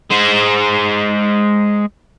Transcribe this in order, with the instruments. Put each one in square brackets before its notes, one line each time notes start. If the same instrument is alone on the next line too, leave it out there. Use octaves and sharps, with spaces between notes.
[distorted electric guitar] G#3 C5